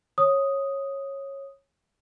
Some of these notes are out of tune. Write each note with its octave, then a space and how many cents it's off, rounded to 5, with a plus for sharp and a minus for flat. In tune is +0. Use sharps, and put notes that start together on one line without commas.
C#5 -15 D#6 +0